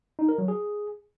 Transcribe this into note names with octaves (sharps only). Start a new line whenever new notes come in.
D#4
A#4
F#3
G#4